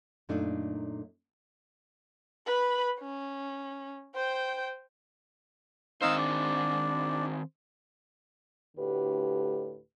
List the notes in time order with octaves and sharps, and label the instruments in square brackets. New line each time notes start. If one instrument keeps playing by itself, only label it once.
[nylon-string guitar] F#2 A#2 A3 D4 D#4
[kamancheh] B4 B5
C#4
C5 G5
[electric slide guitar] D#3 C4 C5 [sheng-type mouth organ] D#4 F5 E6
[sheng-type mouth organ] D4
[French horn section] D2 A2 D3 G4 B4